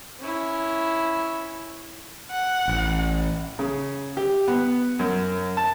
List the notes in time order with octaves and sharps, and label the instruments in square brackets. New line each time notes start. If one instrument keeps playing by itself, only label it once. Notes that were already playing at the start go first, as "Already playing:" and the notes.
[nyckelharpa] C#4 E4
[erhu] F#5
[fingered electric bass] A1
[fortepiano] C#3
G4
B3
F#2
A5